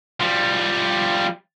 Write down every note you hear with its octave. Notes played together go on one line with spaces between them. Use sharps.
F3 G3